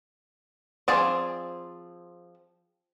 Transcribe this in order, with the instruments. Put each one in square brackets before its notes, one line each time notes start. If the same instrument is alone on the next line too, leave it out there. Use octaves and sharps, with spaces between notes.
[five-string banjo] F3 C4 G#4 D5